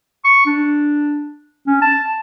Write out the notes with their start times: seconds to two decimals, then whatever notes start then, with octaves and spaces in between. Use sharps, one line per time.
0.25 C#6
0.46 D4
1.67 C#4
1.82 A5